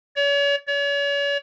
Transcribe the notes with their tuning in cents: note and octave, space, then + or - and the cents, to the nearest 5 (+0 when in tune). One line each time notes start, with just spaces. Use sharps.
C#5 +40
C#5 +40